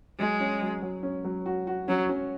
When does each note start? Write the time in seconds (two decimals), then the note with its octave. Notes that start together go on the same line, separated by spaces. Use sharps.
0.19 F#3 G#3
0.40 C#4
0.62 F#3
0.82 F#3
1.03 C#4
1.25 F#3
1.46 F#4
1.67 F#4
1.88 F#3 C#4
2.09 C#4